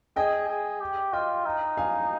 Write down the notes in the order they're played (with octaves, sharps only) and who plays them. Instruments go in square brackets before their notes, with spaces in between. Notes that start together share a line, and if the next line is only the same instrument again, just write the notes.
[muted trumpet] G#4 [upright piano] D#5 G5
[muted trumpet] G#4
G4
[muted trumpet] F4 [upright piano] D#5 G5
[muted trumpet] D#4
[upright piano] F5 G#5